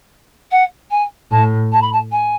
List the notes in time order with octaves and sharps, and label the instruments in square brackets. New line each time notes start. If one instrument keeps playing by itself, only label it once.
[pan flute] F#5
G#5
[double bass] A2 [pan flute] A5
[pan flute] A5
B5
A5
G#5